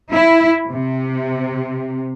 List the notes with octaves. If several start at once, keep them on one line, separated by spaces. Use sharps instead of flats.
E4
C3